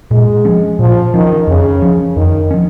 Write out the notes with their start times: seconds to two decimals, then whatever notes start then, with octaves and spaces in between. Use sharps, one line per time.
0.11 A#2 G#3
0.45 F3 C#4
0.79 A#2 F3
1.14 D#3 F3 C#4
1.47 F2 C#3
1.82 F3 C#4
2.16 F2 D#3
2.51 F3 C#4